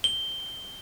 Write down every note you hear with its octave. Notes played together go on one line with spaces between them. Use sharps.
G7